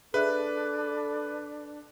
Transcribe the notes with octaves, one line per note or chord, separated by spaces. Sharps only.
D4 G#4 A4 B4 E5 F#6